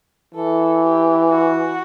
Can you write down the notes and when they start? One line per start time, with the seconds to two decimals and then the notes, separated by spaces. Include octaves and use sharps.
0.34 E3 A4
0.83 G4
1.30 F#4